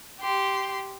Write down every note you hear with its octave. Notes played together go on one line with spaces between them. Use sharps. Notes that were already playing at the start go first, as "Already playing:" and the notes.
G4 C6